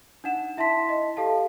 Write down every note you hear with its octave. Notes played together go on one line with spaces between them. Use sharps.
D4 D#4 F#5 E7
E4 E5 A5 C6 B6
D#5
G4 A4 F5 A5